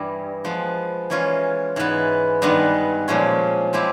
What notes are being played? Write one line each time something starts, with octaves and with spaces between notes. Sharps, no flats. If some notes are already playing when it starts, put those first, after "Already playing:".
Already playing: G2 E3 G3
F3 G#3 B3
E3 G#3 C#4 F4
G#2 E3 G#3 B3
G2 D#3 G#3 B3
A#2 F3 G#3 C#4
F3 G#3 C4 E4 G4